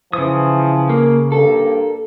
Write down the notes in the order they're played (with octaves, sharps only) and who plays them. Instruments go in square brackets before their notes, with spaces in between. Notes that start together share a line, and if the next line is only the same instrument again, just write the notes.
[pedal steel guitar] C#3 D#6 [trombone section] E3 F3
[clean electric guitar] A#3
[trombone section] G2 A#3 [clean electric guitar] A4